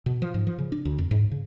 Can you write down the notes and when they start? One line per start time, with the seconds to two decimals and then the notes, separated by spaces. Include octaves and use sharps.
0.06 B2
0.22 F3
0.34 G#2
0.47 F3
0.59 C#3
0.72 D4
0.85 D2
0.98 F2
1.11 G#2
1.31 C#3